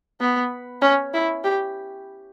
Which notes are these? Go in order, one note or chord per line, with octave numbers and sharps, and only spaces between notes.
B3
C#4
E4
G4